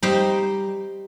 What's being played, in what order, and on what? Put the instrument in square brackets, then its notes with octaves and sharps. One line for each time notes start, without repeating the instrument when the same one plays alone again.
[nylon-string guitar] G3 [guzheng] D#4 G4 C5